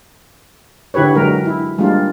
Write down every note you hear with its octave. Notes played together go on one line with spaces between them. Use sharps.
D3 E4 G4 B4 C#5
D3 F#3 G#3 A#4
E4
G3 G#3 A#3 D4 F4